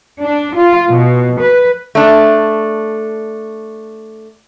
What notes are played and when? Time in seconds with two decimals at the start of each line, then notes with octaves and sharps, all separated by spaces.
0.20 D4
0.55 F4
0.90 B2
1.40 B4
1.95 A3 D4